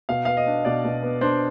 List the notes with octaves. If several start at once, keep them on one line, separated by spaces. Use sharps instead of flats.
B2 F5
B3 F5
D#5
D4
B2 D5
B2
B3
D4 C5